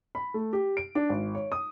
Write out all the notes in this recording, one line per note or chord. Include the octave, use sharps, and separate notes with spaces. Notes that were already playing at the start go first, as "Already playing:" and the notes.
B5
A3
G4
D7
D4
G#1
C#5
D#6